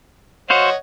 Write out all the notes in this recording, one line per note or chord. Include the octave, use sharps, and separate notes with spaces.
F#4 C5 C#5 D#5 F5 F#5